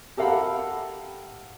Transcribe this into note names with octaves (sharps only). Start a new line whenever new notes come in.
G4 A4 A#4 F5 F#5 B5